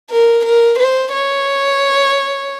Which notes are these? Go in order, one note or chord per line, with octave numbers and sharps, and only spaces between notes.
A#4
A#4
C5
C#5